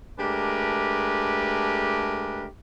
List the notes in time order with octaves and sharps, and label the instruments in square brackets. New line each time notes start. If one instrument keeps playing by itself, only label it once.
[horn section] G#3 A3 D4 G4 A#4 B4